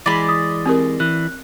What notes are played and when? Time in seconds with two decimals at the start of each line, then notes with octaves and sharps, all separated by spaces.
0.06 E3 G#3 D5 B5
0.29 D#6
0.66 C4 G4 A#4
1.00 E3 F#6